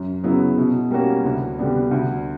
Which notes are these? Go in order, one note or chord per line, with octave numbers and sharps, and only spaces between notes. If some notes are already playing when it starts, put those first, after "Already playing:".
Already playing: F#2
C#3 F#3 B3 E4
B2
G3 A#3 C#4 F#4
D2
D3 G3 B3 D4
D2